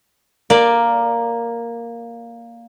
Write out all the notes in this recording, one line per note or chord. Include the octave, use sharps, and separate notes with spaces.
A#3 D5